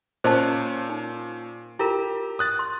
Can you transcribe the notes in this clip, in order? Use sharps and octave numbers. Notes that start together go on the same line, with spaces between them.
A#2 C#4 C5 D#5 A5
D#4
E4 F4 G4 A#4
D#6 F#6 A6
C6